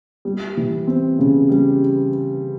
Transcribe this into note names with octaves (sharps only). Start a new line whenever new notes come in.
G3
E3
C4
C#3
G3